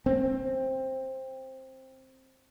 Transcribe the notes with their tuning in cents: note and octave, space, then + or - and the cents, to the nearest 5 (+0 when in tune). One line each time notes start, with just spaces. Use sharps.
C4 +10